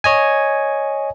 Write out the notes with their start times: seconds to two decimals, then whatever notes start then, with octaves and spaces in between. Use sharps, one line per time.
0.04 C#5 D#5 G#5